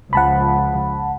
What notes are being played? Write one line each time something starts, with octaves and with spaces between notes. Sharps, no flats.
C#2 F3 F#5 A5 B5